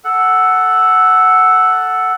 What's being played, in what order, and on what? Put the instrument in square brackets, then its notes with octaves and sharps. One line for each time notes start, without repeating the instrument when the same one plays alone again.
[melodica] A4 F#5